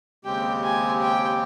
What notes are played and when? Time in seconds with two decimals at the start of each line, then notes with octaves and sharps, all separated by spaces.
0.25 D#2 C#3 G#3 C4 G4 G5
0.63 G#5
1.01 G5